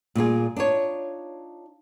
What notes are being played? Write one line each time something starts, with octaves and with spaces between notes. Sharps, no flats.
A#2 G3 F4 G#4
D4 D#4 F4 C#5